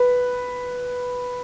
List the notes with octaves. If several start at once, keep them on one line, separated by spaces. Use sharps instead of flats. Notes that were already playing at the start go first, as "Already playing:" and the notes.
Already playing: B4